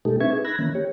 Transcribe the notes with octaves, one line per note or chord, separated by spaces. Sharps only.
B2 G#3 A3 D#4 G4 A4
C4 D4 B4 E5 C#6 G#6
D#4 G#4
B5 E6 F#6 G#6 A#6
D#3 E3 A#3 C#4
G4 C#5